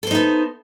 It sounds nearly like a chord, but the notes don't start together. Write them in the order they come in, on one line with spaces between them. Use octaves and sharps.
A4 C5 D#4 B3